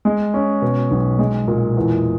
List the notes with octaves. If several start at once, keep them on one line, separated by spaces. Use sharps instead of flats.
G#3
C#4
B2
B1
G#3
A#2
E2